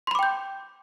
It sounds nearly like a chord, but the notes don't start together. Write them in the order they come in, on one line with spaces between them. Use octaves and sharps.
C6 B5 D6 G5 G6